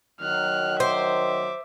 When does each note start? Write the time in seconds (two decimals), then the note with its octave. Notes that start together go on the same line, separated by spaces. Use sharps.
0.20 D#3 F#3 F6 F#6
0.80 C5 E5 D6